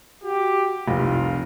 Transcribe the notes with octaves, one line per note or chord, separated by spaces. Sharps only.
F#4 G4
F1 C2 F4